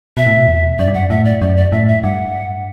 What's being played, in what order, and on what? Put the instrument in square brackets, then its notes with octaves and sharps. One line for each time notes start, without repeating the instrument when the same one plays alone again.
[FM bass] B2 [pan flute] E5
[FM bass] A2
B2
E2
[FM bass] F#2 [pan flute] D5
[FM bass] G2
[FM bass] F#2 [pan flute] F#5
[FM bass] A2 [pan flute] E5
[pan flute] D5
[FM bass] F#2 [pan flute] D5
[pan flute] D5
[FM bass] A2 [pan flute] E5
[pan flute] E5
[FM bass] G2 [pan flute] F#5